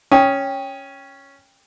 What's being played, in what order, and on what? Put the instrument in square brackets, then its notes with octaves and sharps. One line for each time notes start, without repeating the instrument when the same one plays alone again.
[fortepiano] C#4 [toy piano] G5 C#6 D#6